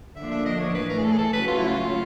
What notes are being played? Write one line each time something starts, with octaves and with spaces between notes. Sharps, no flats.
D3 F3 A#3 D4 E5
E5
D#5
C#5
A2 E3 A3 B4
A#4
G#4
A4
G#4
A4
C#3 F#3 A3 C#4 F#4 B4
F4
E4
F4